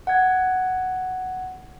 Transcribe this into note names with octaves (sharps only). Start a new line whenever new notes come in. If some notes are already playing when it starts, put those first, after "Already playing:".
F#5 G#6